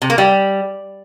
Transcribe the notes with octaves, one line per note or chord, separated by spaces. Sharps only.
C3
A#3
G3